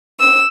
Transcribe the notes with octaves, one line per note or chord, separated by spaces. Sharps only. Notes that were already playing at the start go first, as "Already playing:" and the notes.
E6